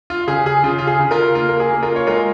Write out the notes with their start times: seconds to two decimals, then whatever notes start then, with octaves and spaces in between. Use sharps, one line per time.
0.10 F4
0.27 C#3 G#4
0.46 G#4
0.64 C#3 F4
0.78 F4
0.87 G#4
0.99 C#3
1.11 F4 A#4
1.35 A#3 F4
1.49 A#4
1.60 G#4
1.71 A#3
1.83 F4 A#4
1.96 C#5
2.07 G#3 F4 A#4